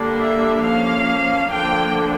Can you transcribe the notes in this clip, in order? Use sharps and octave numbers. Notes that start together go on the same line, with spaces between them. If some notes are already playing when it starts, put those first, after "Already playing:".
Already playing: D3 G3 A#3 D4
E5
F3 A#3 C#4 F5
D3 F3 A#3 D4 G5